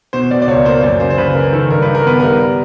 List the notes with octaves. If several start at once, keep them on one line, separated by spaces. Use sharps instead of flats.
B2 C5
B2 D5
D5
C#2 C#5
A#3 C5
F#2 D5
C#3 C5
C5
C#3 B4
C#3 A#4
D#3 A4
G2 A#4
B4
D#3
A#4
B3 B4
G3 A#4